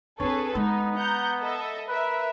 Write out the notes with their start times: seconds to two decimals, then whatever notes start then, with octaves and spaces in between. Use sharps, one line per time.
0.20 C4 D4 G#4 A4 B4 C#5
0.55 G#3 B3 D#4
0.96 F#5 A#5 G6
1.40 A4 D#5 E5
1.89 A#4 B4 E5